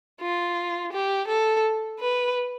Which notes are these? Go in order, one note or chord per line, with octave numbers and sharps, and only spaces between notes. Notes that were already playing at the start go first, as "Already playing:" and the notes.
F4
G4
A4
B4